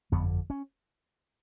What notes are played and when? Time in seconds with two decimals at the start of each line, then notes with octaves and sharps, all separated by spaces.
0.12 G1 F2 D3 B3
0.50 C#4